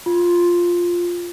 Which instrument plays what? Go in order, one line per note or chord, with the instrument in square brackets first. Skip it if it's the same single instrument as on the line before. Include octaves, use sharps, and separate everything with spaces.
[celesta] F4